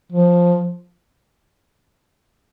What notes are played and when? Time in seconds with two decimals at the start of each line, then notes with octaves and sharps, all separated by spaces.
0.12 F3